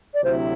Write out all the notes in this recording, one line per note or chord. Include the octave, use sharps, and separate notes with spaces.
D5
D2 C3 F#3 C4 E4 C5